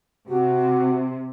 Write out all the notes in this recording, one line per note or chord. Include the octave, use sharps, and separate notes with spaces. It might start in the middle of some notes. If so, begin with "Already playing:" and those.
C3 F#4 G4